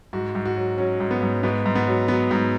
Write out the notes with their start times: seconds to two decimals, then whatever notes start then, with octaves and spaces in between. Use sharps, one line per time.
0.13 G#2 F#4
0.35 G#2
0.45 F#4
0.56 F#3
0.78 F#3 C#4
1.00 G#2
1.11 B3
1.22 G#2
1.43 G#2 B3
1.66 G#2
1.75 B3
1.87 F#3
2.08 F#3 B3
2.31 G#2